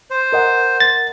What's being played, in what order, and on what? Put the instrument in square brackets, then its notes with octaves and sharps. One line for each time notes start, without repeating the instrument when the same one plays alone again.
[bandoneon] C5
[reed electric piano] A#4 D#5 F#5
[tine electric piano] A6